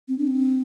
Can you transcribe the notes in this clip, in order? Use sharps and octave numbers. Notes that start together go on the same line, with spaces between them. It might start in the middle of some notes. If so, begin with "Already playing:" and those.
C4
D4
C4